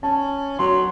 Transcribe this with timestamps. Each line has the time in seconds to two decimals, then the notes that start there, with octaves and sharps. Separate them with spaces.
0.03 C#4 A5
0.59 F#3 C6